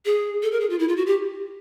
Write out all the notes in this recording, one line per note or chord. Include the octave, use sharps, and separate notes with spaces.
G#4
A4
A#4
G#4
F4
E4
F4
F#4
G4